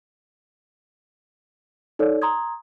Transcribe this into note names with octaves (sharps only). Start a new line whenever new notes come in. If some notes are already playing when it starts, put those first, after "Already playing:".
D#4 A4 C#5 D5
A#5 C6 D#6 G#6